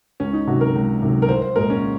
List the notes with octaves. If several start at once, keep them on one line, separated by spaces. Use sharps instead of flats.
C#2 C#4
D#4
C3 D#3 F#3 F#4
A#4
C#2
C3 D#3 F#3
A#4
C2 C5
C5
A#2 G#3 A#4
C#4